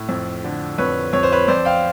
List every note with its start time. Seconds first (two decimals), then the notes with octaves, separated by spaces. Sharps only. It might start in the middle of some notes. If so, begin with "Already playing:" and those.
Already playing: A2
0.09 F2
0.44 D3
0.78 F2 B4 C#5
1.13 F2 C#5
1.23 C5
1.32 B4 C#5
1.48 F2 C5 D5
1.65 F5 G5